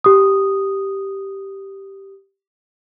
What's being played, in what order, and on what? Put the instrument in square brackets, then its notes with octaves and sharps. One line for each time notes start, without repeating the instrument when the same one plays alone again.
[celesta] G4 D#6